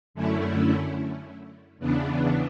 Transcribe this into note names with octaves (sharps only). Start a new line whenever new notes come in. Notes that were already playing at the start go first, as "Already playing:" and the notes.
F#2 D3 A3 C#4 E4
E2 C#3 E3 B3 D4